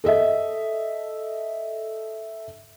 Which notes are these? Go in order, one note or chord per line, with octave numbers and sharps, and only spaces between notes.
A4 D#5 E5